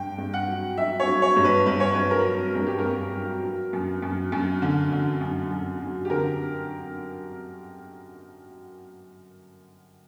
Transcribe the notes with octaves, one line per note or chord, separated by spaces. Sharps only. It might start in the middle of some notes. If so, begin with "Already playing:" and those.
Already playing: G2 G5
G2
F#5
F#3
F#3 E5
C#5
F#3
C#5
G2
B4
G2 B4
C#5
F#3 B4
A#4
F#3
G2 A#4
G4
A#4
G2
F#3
F#3
F#2
F#2
F#2
D3
D3
F#2
F#2
F#3
G4
D3 A#4